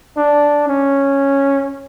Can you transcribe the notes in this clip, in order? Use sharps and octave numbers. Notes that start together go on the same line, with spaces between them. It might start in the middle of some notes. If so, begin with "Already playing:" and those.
D4
C#4